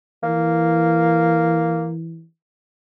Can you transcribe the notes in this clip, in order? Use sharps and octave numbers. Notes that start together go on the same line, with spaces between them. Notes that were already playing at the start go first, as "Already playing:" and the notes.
E3 A#3